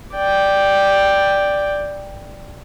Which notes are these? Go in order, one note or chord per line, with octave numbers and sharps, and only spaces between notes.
D5 G5